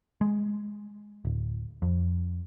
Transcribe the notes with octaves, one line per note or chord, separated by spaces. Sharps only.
G#3
D1
F2